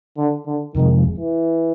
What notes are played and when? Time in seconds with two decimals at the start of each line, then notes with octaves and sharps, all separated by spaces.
0.17 D3
0.46 D3
0.75 F2 C3 D#3 F3 G#3
1.18 E3